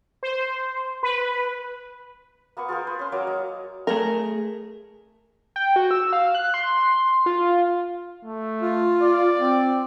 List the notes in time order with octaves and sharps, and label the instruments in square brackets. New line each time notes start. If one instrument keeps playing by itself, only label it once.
[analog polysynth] C5
B4
[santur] A#3 B3 B4 C#6
F4 G#4 A#4 C5
B4
C#4 C6
F#3 A#3 C#5 D6
D#5
[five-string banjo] A3 G#4 A#4
[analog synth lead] G5
F#4
E6
F5
F#6
C6
F4
[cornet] A3
[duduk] F4
[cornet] D5
[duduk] C4